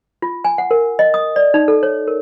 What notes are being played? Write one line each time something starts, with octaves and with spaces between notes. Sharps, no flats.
F4
G#5
F#5
A#4
D#5
D#6
D5
D#4
A4
C#5
A#4